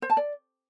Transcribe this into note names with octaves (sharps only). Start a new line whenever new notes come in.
C5
A5
D5